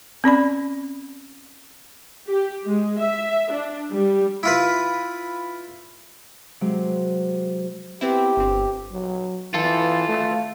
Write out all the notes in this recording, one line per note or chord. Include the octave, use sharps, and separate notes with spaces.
C4 C#4 D5 B5
G4
G#3
E5
D4
G3
E4 F4 B4
C3 F#3 G#3
B3 C4 E4 G4
G1 C4
F#3
E3 F4 A4
A3